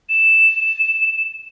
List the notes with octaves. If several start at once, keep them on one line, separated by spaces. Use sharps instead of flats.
E7